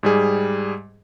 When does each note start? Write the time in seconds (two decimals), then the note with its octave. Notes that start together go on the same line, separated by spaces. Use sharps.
0.03 G#2 G3 G#4